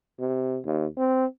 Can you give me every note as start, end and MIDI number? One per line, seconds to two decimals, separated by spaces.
0.19 0.59 48
0.65 0.86 39
0.97 1.25 60